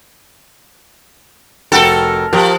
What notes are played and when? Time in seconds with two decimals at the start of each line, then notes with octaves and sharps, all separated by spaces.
1.72 F1 F#4 A4 A#4 G5
2.33 F3 G4 A#4